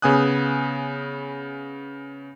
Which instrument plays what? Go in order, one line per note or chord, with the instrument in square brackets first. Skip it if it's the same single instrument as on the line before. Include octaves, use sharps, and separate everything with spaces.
[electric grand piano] C#3 B3 G#5 D#6 F#6